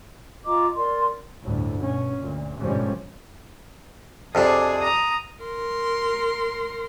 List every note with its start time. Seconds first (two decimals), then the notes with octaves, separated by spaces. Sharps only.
0.45 F4 D#5 A#5 D6
0.77 A#4 D5 C6
1.43 G1 D2 A2
1.79 B2 C#4
2.19 D2 A#2
2.59 G1 G#2 B2 F3 G3 C#4
4.35 F2 C3 D4 G#4
4.79 A#5 D#6
5.44 A#4 C6